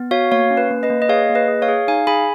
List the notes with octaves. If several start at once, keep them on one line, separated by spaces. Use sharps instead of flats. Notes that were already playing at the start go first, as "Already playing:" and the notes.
Already playing: B3
F#4 C#5 F5
A#3 C#5 F5
C#4
B4
A#3
B4 D#5
A#3
D#5
G#4 C#5 F5
A#3
B4 D#5
G#4
C#5 F5
G#4
D#4 F5 G#5
G#4 G#5 B5